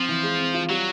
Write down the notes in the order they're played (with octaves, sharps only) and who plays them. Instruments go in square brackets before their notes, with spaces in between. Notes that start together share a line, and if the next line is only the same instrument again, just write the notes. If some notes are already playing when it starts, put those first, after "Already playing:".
Already playing: [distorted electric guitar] F3 [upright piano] C4
[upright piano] E3
G#3
C4
F4
[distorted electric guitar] F#3 [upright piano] G3